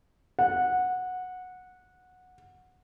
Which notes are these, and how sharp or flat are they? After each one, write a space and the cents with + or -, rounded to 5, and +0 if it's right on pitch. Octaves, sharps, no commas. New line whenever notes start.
F#5 -15